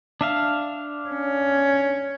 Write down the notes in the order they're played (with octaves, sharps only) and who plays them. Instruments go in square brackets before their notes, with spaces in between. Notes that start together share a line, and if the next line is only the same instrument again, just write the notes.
[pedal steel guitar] D4 E5 F5
[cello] C#4